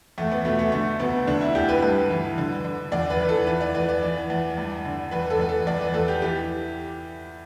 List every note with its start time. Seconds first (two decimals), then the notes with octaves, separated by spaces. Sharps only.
0.18 E2 A3
0.31 B3
0.45 B2 A3
0.59 A3
0.72 D3 A3
1.00 D2 B3
1.27 D3 D4
1.41 E4
1.55 D2 G4
1.69 B4
1.83 G2
2.10 E3
2.38 D3
2.64 D3
2.92 E2 D5
3.10 B4
3.20 E3
3.29 A4
3.47 E3 B4
3.61 D5
3.74 E2 B4
3.89 D5
4.02 E3
4.30 E2
4.57 G2
4.85 D3
5.11 E2 B4
5.30 A4
5.40 E2 B4
5.49 A4
5.67 E2 D5
5.81 B4
5.94 E2 A4
6.08 G4
6.22 E3 G4